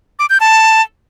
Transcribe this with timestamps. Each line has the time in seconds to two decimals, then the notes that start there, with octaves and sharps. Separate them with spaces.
0.19 D6
0.30 G6
0.40 A5